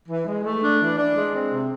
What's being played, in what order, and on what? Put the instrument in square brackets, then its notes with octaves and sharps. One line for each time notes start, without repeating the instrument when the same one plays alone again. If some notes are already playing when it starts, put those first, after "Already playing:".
[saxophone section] E3
G#3
A3
D4
E3
D4
G#3
C4
C3